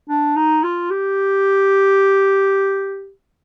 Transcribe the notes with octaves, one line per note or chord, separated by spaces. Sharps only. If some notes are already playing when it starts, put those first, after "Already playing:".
D4
D#4
F4
G4